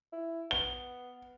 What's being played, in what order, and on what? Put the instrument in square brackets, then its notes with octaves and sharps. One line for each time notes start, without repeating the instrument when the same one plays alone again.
[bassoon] E4
[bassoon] B3 [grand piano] G7